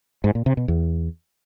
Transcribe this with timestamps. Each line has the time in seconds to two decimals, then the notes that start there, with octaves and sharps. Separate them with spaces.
0.24 G#2
0.35 A#2
0.46 C3
0.57 B2
0.68 E2